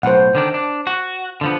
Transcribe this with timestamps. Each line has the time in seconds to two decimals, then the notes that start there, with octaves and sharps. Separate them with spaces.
0.03 B1 A2 C5 F#5
0.35 D3 D#3 D4
0.54 D4
0.87 F#4
1.41 D3 F3 B3